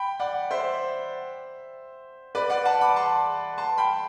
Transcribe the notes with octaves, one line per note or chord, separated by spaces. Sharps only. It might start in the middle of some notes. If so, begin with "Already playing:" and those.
Already playing: G5 B5
D5 F#5
C5 E5
B4 D5
D5 F#5
F#5 A5
B5 D6
A5 C6
A5 C6
G5 B5